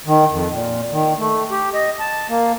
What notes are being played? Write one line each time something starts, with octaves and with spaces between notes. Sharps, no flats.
D#3
F2
A#2
D#3
A3
G4
D#5
A5
A#3